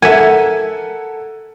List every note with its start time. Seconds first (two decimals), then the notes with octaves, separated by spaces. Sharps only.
0.02 A4 A#4 E5 F#5 G#5